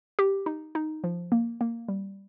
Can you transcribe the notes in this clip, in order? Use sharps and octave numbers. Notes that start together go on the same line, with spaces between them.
G4
D#4
D#4
F3
A#3
A#3
G3